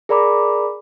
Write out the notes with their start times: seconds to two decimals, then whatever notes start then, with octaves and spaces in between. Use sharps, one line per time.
0.09 G#4 A#4 D5 A#5 B5 D6